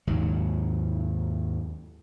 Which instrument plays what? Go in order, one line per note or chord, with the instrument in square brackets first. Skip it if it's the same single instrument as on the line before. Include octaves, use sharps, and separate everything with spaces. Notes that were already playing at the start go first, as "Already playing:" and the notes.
[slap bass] D#2 G#2 F#3